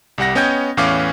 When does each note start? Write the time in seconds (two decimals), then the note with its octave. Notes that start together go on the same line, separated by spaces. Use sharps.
0.18 C2 G3 F#5 A#6
0.35 B3 C#4 D#5 G5 G6 G#6
0.77 E2 A2 E3 C#4 F5 D6